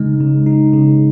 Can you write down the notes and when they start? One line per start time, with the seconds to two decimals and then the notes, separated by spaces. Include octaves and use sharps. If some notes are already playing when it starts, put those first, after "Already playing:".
Already playing: C#3 G#3 D#4
0.21 C#3
0.46 D#4
0.73 C#3